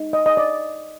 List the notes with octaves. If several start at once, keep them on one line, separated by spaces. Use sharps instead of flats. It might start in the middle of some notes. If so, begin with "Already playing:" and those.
Already playing: D#4
D#5
D#5
D5